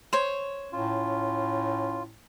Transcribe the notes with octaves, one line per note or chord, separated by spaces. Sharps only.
C5 C#5
A2 C#4 F4